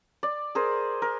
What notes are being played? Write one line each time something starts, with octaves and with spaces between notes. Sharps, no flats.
D5
G#4 A#4 C5
A#4